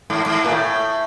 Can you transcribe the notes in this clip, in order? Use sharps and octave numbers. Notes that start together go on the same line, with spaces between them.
G#2
G#2
A#2
A2